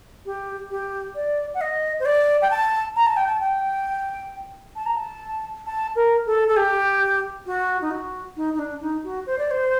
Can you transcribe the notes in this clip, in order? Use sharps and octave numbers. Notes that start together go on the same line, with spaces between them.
G4
G4
D5
F#5
D#5
C5
D5
G5
A5
A#5
A5
G5
A5
G5
A5
A#5
A5
A5
A#4
A4
A4
G4
F#4
D#4
F#4
D#4
D#4
D4
D#4
F#4
C5
D5
C5